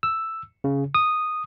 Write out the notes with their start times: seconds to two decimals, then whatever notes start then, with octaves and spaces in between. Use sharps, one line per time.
0.03 E6
0.64 C#3
0.95 D#6